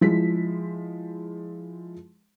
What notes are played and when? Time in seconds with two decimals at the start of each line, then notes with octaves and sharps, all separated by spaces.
0.01 F3 G#3 E4 B6